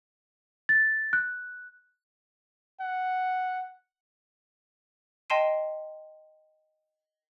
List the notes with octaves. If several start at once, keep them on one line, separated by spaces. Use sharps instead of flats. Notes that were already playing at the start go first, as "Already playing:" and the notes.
A6
F#6
F#5
D#5 G5 A5 C6 C7 D#7